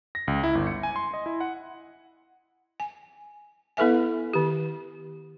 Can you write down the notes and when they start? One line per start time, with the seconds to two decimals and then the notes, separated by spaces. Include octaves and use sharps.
0.15 A#6
0.28 C#2
0.43 E4
0.55 G1
0.67 C#7
0.83 G#5
0.96 C6
1.13 D#5
1.26 E4
1.41 F#5
2.80 G#5
3.77 B3 E4 A4 B4 E5 G#5
4.33 D#3 G4